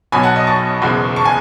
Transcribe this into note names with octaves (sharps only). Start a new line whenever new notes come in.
B1 B2 F#3 G#5 B5
F#5 A5
D#5
A5 C#6
F#1 E2 B2 G#3
A5 C#6
G#5